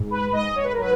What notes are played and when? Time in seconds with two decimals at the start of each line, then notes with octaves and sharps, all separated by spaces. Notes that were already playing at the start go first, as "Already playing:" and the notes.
Already playing: G#2
0.11 B4
0.32 G#2 D#5
0.56 C#5
0.64 B4
0.72 A#4
0.77 F#3 B4